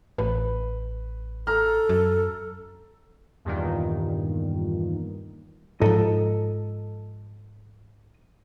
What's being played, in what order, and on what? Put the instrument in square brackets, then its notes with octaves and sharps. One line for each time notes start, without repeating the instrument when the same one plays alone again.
[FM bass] A1 [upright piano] B4
[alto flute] A4 [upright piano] A#5 F6
[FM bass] F#2
[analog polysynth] E2 G2 A#2 D#3
[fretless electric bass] G#2 F3 [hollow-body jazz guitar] A4 D#5 A#5